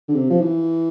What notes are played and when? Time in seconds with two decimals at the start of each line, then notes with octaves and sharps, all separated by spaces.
0.08 D3
0.15 C3
0.30 F3
0.41 E3